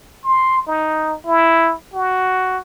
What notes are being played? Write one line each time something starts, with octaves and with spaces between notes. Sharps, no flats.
C6
D#4
E4
F#4